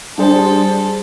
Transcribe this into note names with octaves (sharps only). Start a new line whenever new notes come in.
G3 D4 G#4 A4 C5